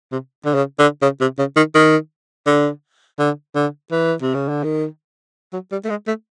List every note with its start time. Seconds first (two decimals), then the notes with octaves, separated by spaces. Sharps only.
0.12 C3
0.45 D3
0.54 C#3
0.79 D3
1.02 C#3
1.21 C3
1.38 C#3
1.56 D#3
1.75 D#3
2.46 D3
3.19 D3
3.55 D3
3.91 E3
4.22 C3
4.34 C#3
4.48 D3
4.63 D#3
5.52 F#3
5.71 G3
5.84 A3
5.89 G#3
6.07 A3